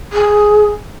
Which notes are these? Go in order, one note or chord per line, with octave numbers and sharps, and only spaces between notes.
G#4